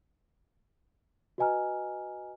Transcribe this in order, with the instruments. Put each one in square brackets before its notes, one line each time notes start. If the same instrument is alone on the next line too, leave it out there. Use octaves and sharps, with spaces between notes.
[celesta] F#4 B4 D#5 G#5 A#5 F6